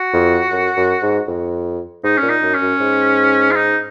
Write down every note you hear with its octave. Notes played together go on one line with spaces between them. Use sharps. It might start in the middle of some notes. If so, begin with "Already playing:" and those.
Already playing: F#4
F2
F#2
F#2
G#2
F2
G#2 D#4
A#2 C#4
D#4
F#2
C#4
F#2
G#2
F4
D#4